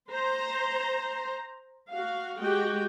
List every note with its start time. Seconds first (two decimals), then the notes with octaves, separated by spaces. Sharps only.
0.12 C5 A#5
1.88 F#4 F5
2.39 G#3 F#4 G4 G5